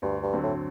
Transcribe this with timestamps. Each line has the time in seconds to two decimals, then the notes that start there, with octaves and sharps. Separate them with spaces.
0.02 D2 G2
0.23 G2
0.33 D3 F#3 C4
0.43 A2